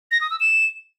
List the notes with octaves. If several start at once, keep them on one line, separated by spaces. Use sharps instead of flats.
A#6
D#6
E6
E7